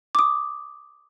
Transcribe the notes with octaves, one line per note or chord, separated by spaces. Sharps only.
D6 D#6